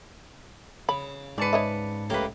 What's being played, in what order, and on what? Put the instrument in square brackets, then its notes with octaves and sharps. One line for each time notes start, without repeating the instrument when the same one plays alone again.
[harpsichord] C#3 [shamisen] B5
[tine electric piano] G#2 A5 C#7 [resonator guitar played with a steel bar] B4 D5
[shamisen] C#5 D#5 E5
[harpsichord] C#2 A2 G4 [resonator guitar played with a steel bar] A#3 B4